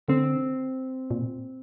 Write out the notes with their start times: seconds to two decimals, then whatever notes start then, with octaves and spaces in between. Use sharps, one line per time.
0.08 D3 C4
1.11 A#2